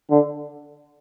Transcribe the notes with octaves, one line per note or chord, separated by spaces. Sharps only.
D3